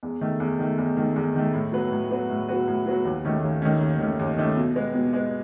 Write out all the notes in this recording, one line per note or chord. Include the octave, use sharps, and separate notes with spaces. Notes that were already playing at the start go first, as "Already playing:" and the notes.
E2
D#3 A3
E2
D#3 A3
E2
D#3 A3
E2
D#3 A3
A2
F#3 B3 F#4 B4
A2
F#3 B3 F#4 B4
A2
F#3 B3 F#4 B4
A2
F#3 B3 F#4 B4
D#2
D#3 A3 C#4
D#2
D#3 A3 C#4
D#2
D#3 A3 C#4
D#2
D#3 A3 C#4
B2
G#3 B3
B2
G#3 B3